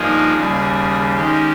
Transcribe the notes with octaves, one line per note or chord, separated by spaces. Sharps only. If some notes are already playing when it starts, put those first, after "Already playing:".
Already playing: G2 F3 A#3 D#4 G#4
D#2 C#3 G3
D#3 G#3 C#4 G4